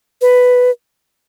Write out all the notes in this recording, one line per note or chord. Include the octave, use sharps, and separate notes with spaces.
B4